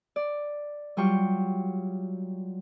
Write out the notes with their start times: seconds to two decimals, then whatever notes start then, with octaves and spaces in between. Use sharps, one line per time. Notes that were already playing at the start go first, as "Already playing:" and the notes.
0.16 D5
0.97 F#3 G3 F4 G5 C#6